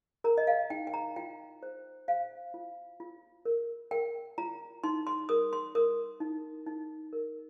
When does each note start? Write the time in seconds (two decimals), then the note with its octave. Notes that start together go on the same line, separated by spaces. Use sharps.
0.24 A#4 A#5
0.38 D#5
0.47 F5
0.70 D#4 G5
0.87 G5
0.94 A#5
1.16 F4 G5
1.63 C5
2.08 C5 F5
2.54 F4
3.00 F4
3.45 A#4
3.91 A#4 G5
4.38 F4 A#5
4.84 D#4 C6
5.07 C6
5.29 A#4 D#6
5.53 C6
5.75 A#4 D#6
6.20 D#4
6.66 D#4
7.13 A#4